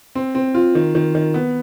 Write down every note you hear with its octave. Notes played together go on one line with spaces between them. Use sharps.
C4
C4
F4
D#3
D#3
D#3
B3